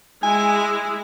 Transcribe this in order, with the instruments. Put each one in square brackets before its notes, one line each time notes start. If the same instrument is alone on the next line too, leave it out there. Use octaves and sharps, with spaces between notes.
[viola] G#3 E4 [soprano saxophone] G#5